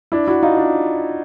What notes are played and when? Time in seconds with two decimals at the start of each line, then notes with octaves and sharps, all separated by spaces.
0.12 D4 E4
0.28 E4 F#4
0.43 D#4 F4
0.57 D4